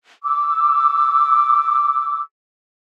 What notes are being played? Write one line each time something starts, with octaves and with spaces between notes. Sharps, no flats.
D6 E6